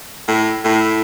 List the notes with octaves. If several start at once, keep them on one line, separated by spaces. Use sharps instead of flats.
A2
A2